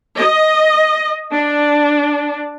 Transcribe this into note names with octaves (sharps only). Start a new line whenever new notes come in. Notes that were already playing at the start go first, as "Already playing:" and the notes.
D#5
D4